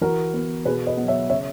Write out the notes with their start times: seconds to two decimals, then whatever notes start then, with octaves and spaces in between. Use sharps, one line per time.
0.01 E3 F#4 A#4
0.34 B3
0.65 B2 G#4 B4
0.87 B4 D#5
0.97 F#3 B3
1.08 C#5 E5
1.29 C#3 C#5 E5